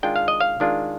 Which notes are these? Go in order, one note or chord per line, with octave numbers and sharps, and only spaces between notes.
D#3 G#3 D4 F4 G5
F5
D#5
F5
D#3 G#3 D4 F4